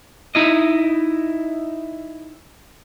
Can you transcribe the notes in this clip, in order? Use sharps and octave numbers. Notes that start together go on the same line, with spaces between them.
D#4 E4 D#5